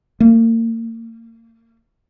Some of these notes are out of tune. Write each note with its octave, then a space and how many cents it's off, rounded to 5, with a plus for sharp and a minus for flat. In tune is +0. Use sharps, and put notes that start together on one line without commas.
A#3 -35